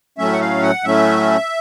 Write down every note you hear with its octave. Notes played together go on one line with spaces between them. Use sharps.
A2 F#3 A3 C#4 E5
F#5
F5
F#5
A2 F#3 A3 C#4 E5